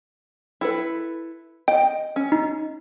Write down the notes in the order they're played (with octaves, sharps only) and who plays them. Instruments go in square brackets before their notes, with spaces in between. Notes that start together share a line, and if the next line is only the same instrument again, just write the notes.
[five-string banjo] E4 A4 B4
[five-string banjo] D#5 [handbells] G5
[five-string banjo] C#4
[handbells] D#4